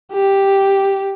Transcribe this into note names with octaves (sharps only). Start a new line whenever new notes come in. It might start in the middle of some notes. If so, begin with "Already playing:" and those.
G4